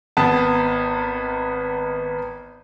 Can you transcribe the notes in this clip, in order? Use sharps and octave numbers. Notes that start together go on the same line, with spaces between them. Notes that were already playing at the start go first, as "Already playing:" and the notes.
G#1 B3 A5